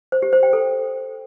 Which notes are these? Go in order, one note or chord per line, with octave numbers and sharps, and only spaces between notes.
C5
G4
C5
G5
A4